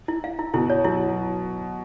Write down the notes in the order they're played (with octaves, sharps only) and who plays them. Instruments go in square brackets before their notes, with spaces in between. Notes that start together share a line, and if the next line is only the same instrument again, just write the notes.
[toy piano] E4
F5
E4
[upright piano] B2 [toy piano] E4
[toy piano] C#5
[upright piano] F#3 [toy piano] E4